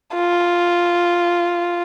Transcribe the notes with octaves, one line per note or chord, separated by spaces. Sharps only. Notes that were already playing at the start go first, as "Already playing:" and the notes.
F4